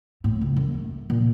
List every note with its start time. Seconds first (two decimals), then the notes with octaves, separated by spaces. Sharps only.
0.24 A2
0.41 C#2
0.56 F#2
0.74 A3
1.10 A#2